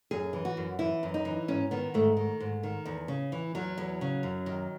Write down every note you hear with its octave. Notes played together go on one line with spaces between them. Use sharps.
F#2 G#4
E3
F#4
F#2
E3 E4
F#2
D#4
E3
G#2 C#4
D#3 B3
G#2 A3
D#3
G#2
D#3
E2
C#3
E3
E2 F#3
E2
C#3
F#2
D#3